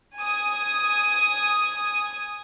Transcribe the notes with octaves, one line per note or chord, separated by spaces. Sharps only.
G#5 D#6